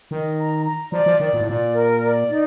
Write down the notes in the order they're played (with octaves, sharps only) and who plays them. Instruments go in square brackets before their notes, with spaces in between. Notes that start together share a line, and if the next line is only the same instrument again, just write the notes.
[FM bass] D#3 [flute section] D#5
[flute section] A#5
A#5
[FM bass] F3 [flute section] D5
[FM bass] F3
[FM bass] D#3 [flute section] D5
[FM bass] A#2
A2
[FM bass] A#2 [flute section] D5
[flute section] A#4
D5
D#4